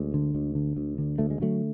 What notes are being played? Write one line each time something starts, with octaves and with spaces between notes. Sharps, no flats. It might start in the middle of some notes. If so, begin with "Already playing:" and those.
Already playing: D2 G#3
D3
D2
D3
D2
D3
D2 A3
G#3
D3 F#3 A3